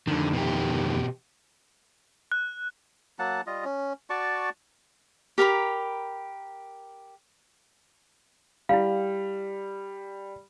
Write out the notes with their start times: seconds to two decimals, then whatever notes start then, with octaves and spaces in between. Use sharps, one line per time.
0.08 F2 D3 D#3
0.33 B2 G4
2.32 F#6
3.19 F#3 A#3 F#5 A5
3.46 G3 F4 D#5
3.65 C#4
4.10 F#4 D5 A5 C#6
5.38 G4 A#4 A#5 B5
8.69 G3 E4 F5